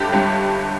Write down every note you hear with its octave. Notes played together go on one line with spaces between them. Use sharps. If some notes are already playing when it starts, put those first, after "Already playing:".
Already playing: G1 G2 D3 G4
G1 G2 D3